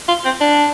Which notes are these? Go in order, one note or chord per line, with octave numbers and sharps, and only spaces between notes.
F4
C4
D4